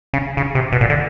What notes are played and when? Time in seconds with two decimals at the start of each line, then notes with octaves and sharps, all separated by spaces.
0.13 C#3
0.37 C#3
0.55 C3
0.72 B2
0.81 A#2
0.90 D3